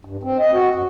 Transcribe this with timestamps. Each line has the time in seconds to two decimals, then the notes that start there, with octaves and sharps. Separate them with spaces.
0.05 G2
0.23 C4
0.39 D#5
0.53 F#4
0.75 F#2